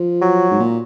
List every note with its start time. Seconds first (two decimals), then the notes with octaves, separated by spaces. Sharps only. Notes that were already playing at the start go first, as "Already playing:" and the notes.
Already playing: F3
0.22 F#3
0.51 G#2
0.60 A#2